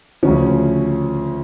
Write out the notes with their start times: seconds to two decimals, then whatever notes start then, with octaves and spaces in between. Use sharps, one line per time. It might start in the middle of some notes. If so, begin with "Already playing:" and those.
0.23 D2 C#3 F3 C#4